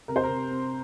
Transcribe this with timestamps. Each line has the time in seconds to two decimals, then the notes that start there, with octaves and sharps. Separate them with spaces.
0.08 C3 A#4
0.16 C5
0.23 A#4
0.29 C3
0.51 C4